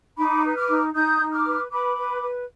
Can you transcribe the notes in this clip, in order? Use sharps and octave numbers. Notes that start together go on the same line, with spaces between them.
D#4 B5 D6
B4
D6 F6
D#4
D#4 D#6 G6
D#4
D6 F6
B4
B4 B5 D6
B4
B4